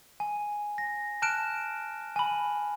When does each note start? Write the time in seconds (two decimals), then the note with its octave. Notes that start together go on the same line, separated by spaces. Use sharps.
0.20 G#5
0.78 A#6
1.22 A5 F6 F#6 D7 E7
2.16 G#5 B5